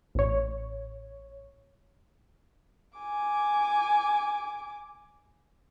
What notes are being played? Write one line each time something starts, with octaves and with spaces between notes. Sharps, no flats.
A1 C#5
G#5 D6